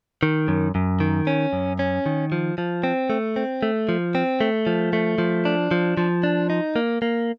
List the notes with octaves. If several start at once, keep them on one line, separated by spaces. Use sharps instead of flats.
D#3
F#2
F#2
D#3
C#4
F#2
C#4
D#3
F3
F3
C4
A3
C4
A3
F3
C4
A3
F3
A3
F3
D4
F3
F3
D4
D#4
A#3
A#3